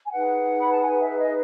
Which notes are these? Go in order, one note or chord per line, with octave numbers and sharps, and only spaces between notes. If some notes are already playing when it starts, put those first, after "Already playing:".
G#5
D#4 G#4 B4 F#5
B5
A5
G#5
E5
D#5